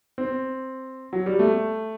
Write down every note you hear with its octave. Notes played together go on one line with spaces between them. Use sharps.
C4
F#3
G3
A3